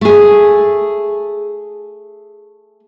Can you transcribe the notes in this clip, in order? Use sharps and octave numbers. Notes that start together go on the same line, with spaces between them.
A3 G#4